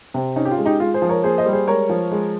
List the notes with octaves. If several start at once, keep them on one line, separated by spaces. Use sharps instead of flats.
C3
C#4 D#4
G4
F4
G#3
D#4 G4
G#3 F4
G#4 C5
F3
A#4 C#5
A#3 G#4 C5
C5 D#5
G3
G#4 C5
G#3 A#4 C#5
F3
G#3